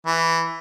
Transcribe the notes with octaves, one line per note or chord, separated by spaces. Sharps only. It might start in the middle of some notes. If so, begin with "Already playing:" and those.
E3